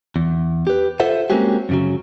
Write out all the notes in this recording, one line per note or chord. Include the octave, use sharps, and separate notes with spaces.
E2
G4 B4
F4 A4 C5 E5 F#5
G#3 A#3 C4 C#4 F#4 G4
F#2 C#3 F#3